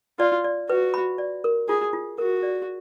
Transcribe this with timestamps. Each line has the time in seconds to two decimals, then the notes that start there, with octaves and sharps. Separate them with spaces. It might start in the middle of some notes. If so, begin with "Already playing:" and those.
0.19 F4 D5
0.44 D5
0.69 F#4 B4
0.94 B5
1.18 D5
1.44 A#4
1.68 F4 G#4
1.93 F4
2.18 F#4 A#4
2.43 D5